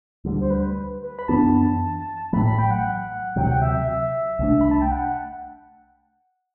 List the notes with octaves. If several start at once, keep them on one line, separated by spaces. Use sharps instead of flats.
D2 D3 G3
C5
B4
B4
B5
F#2 E3 B3 D4 A5
A1 A2 F#3 A3 B5
B5
G5
F#5
D2 C3 F#3 G5
F#5
G5
E5
E5
C2 B2 A3 D4
B5
A5
G5
F#5